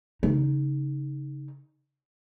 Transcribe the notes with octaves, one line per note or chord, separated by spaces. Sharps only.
C#3 D#4